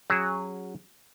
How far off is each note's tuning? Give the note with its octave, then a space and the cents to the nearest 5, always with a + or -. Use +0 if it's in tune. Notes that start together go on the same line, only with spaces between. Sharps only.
F#3 +0 C#4 +0 G#4 -15